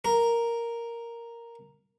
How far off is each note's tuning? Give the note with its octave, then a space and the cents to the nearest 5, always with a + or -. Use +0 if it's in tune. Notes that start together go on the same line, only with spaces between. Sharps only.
A#4 +0 A#5 +0